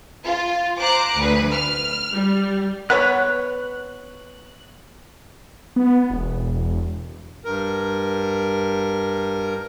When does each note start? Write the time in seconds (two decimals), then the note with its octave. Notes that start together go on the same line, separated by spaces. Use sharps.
0.23 F4
0.78 C5 A#5 D6 F#6
1.15 D2 B4
1.50 F6
2.14 G3
2.90 B3 B4 C#5 F#6
5.76 B3
6.10 E1
7.45 G2 A#4